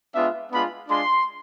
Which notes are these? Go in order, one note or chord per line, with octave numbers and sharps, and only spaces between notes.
G#3 B3 D4 F4 E5
G#3 B3 D4 F4 B5
G#3 D4 F4 C6